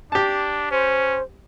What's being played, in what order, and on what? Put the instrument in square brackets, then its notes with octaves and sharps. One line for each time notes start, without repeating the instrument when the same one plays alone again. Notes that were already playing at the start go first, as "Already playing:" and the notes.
[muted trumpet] D4 [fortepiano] G4 A5
[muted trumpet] C#4 [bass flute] C5